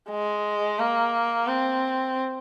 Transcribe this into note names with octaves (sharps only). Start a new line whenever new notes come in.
G#3
A#3
C4